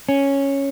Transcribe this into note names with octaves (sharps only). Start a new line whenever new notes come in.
C#4